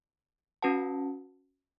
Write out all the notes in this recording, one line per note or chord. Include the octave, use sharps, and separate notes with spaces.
C#4 F#4 B4 F#5 A5